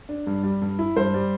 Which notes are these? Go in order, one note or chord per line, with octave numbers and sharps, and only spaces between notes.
D4
G2
G3
G2
E4
G2 C5
G3